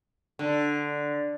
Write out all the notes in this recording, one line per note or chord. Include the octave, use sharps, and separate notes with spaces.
D3